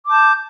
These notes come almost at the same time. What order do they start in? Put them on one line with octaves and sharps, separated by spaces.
D6 A5 G6